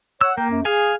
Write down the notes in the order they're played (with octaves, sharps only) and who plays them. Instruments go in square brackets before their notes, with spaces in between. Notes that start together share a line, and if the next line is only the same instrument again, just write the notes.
[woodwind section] C#5 F#5 [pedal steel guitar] E6
[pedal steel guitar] A#3 [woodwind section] A#4 G5
[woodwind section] F#2
[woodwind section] G#4 [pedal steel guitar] F5 G#5